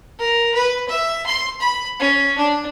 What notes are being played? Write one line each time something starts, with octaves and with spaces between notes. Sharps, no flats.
A#4
B4
E5
C6
B5
C#4
D4